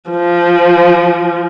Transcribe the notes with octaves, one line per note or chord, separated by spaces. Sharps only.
F3